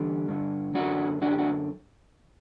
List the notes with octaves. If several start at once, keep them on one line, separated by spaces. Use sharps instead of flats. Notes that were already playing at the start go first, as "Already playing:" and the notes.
Already playing: E2 D3 G3
G2 D3
F#2 D3 D4 F#4
F#2 D3 D4 F#4
G4
D4 F#4